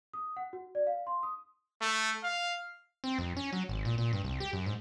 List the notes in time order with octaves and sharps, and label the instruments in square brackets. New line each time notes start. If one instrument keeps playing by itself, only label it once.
[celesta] D#6
F#5
F#4
D5
F5
C6
D#6
[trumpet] A3
F5
[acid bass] C4
F2
C#4
F#3
G#1
A#2
A#2
G2
C2
G4
F#2
G#2